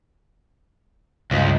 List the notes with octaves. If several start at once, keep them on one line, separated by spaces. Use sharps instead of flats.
C#2 G2 F4 D#5